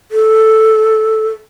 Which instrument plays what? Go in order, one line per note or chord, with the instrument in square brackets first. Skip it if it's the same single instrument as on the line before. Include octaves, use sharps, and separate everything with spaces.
[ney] A4